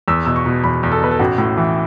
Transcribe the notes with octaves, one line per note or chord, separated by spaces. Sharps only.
E2 E6
B2 E6
C#6
B2
E2 B5
E2
A4
B2 B4
A4
A1 F#4
A2
E3